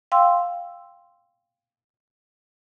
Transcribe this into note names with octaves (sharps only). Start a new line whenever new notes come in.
F5 G5 C6 E6